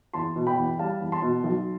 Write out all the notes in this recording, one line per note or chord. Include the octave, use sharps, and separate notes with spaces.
E2 A5 C6
B2
G5 B5
E2
G3 F5 A5
E2
A5 C6
B2
B1